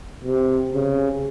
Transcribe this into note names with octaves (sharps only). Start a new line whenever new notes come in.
C3
C#3